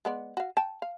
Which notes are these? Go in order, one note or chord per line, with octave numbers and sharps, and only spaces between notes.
G#3 B3 D5
F#4 F5
G5 A5
F5